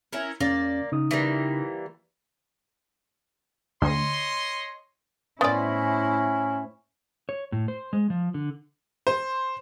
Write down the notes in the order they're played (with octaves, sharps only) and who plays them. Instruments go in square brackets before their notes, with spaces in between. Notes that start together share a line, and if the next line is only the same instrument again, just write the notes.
[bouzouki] C#4 E4 A#4
[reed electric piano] E2 C#4 [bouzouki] A#3 D5
[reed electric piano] C#3 D#4 D#6
[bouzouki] E3 G3 A#3
[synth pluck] D2 [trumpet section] C#5 D#5 C6
[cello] A2 E4 [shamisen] B3 D5 [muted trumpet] C#4 [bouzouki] C5 G#5
[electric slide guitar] C#5
A2
C5
G#3
F3
D3
[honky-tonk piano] C5